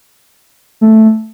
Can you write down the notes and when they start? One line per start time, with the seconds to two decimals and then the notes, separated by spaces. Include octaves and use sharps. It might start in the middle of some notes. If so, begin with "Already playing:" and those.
0.81 A3